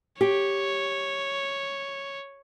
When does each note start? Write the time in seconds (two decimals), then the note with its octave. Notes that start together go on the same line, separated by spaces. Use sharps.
0.21 G4 C#5